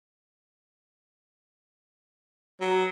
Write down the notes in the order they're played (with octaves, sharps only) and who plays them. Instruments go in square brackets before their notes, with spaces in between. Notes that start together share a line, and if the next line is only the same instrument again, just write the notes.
[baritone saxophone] F#3